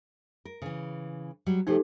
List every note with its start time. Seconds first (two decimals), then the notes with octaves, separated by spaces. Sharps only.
0.45 A#4
0.62 C#3 E3
1.46 F#3 G3
1.67 C3 F3 A3 D#4 G4 A4